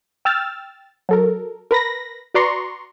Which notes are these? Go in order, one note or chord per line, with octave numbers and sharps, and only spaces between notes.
G5 E6 F6 A6
F#3 A4 A#4
A#4 B4 B5 A#6
F#4 B4 D5 A#5 C6 C#6